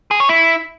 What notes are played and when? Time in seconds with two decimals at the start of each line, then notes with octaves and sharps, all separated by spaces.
0.11 G#4
0.20 C#5
0.29 E4